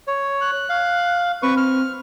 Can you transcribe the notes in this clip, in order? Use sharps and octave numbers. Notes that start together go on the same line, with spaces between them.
C#5
F#6
F5
C4 B4 C#6
F6